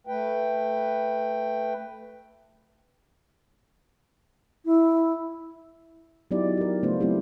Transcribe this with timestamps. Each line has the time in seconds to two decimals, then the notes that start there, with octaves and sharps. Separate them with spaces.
0.07 A3 B4 G5
4.65 E4
6.31 F#3 B3 D#4 E4 G4 D5
6.57 G4 A#4
6.83 C#3 A3 B3 D4 F4 C5
7.00 F#3 A3 C4 D4 E4 G4